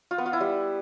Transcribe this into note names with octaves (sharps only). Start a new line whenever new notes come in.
F4
B3
F4
E4
G3